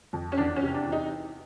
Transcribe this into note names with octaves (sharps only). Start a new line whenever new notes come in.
F2
C#4
E2 D4
C#4
C3
D4
E2
D#4